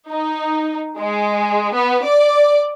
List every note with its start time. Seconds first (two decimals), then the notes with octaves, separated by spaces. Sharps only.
0.11 D#4
0.99 G#3
1.74 B3
2.05 D5